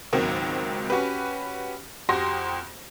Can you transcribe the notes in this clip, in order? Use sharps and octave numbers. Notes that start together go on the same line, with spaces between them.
C#2 G#2 D#3 F#3 A#3 C4
C#4 F#4 G4 B4
F2 F#4 G4 C6 A#6